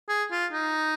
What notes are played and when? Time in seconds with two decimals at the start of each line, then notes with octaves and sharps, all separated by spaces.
0.09 G#4
0.31 F4
0.52 D#4